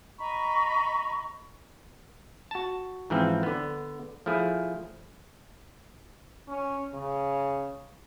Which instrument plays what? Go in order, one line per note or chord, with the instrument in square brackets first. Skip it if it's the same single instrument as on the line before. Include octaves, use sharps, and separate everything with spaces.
[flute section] D#5 A#5 B5 C#6
[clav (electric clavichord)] F#4 A5
G#2 E3 F3 C4
D3 B3
F3 A3 E4 G#4
[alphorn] C#4
C#3